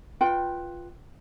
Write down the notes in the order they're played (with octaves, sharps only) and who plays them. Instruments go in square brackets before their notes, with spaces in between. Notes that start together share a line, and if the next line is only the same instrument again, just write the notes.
[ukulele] F4 B4 G5